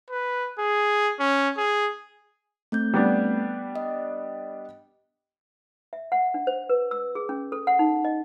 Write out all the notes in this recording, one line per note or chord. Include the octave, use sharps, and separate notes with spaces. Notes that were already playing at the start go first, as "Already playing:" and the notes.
B4
G#4
C#4
G#4
A3 C4 G6
G3 B3 D4
D#5
E5
F#5
D4
C5
B4
E6
G#4
C#4
A4
F#5
D#4
D#5